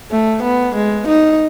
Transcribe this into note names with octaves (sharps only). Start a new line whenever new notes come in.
A3
B3
G#3
D#4